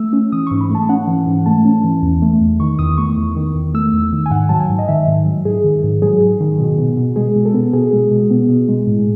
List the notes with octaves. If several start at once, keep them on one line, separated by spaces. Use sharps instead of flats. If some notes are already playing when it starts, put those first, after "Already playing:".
Already playing: A3 E6
C#4
E3 D#6
G#2 C#6
B5
A3 A5
C#4 F#5
E3
G#2
A3 A5
C#4
E3
E2
A3
E2
D#3 C#6
E2 D#6
A3 C#6
E2
D#3
E2
A3 E6
E2
D#3
G#5
G#2 F#5
F#3 A5
G#5
G#2
D#5
D#3 E5
G#2
F#3
G#2 G#4
D#3
G#2
F#3 G#4
G#2
D#3
B2
B3
B2
G#3 G#4
B2
A4
B3
B2 G#4
G#3
B2
B3
B2
G#3
A2